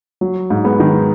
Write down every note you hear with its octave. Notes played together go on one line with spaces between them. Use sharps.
F#3
G#2
G#3 B3
D#3